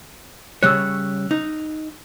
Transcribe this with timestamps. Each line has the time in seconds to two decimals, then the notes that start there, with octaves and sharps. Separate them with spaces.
0.63 C#3 G3 C#5 E6 F#6
1.31 D#4